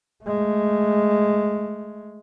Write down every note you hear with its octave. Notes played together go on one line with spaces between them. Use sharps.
G#3 A3